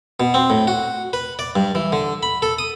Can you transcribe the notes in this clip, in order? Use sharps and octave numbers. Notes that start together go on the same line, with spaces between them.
B2
C4
A2
F#4
B4
D5
G2
E3
D3
B5
A4
D#6